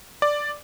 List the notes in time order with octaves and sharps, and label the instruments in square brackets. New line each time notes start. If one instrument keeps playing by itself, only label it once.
[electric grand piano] D5